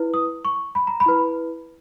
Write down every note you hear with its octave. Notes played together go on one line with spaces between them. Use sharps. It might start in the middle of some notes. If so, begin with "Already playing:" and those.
Already playing: E4 B4
D#6
C#6
B5
A#5
B5
E4 B4